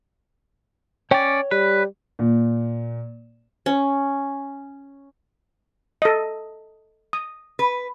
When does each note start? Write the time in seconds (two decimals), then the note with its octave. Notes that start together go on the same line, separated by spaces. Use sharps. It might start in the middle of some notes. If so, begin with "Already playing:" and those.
1.11 C#4 C#5 D5 G5
1.51 G3 B4
2.19 A#2
3.66 C#4
6.02 A4 D#5
7.13 D#6
7.59 B4